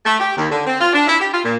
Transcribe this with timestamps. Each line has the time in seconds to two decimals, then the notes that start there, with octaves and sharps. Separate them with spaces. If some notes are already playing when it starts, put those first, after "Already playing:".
0.05 A3
0.19 G4
0.37 D#2
0.50 D3
0.66 C4
0.80 F4
0.93 D4
1.07 E4
1.20 G4
1.33 F4
1.44 A#2